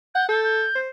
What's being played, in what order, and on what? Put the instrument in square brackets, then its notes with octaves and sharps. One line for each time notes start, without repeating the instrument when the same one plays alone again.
[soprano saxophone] F#5 [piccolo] G6
[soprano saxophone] A4 [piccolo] G6
[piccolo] G6
[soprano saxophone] C5